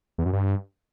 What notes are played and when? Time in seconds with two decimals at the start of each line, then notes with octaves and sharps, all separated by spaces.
0.18 E2
0.26 F#2
0.33 G2